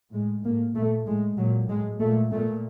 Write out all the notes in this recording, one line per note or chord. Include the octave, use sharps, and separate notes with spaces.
A2 G#3
A2 A#3
A#2 A3
A2 G#3
A#2 F#3
A2 G#3
A#2 A3
A#2 A3